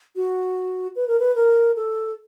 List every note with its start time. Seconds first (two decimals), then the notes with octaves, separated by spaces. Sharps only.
0.16 F#4
0.96 B4
1.08 A#4
1.19 B4
1.36 A#4
1.76 A4